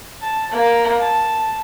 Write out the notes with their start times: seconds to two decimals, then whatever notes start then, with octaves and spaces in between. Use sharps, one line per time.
0.21 A5
0.53 A#3
1.01 A5